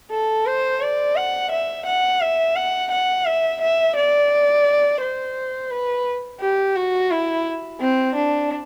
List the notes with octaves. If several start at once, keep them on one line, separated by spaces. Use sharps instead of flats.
A4
C5
D5
F#5
E5
F#5
E5
F#5
F#5
E5
E5
D5
C5
B4
G4
F#4
E4
C4
D4